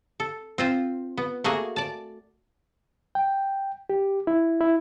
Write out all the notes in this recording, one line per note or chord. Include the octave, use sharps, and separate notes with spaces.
A4
C4 F4 C5
B3
A3 A#3 F#4 G#4
D5 A5
G5
G4
E4
E4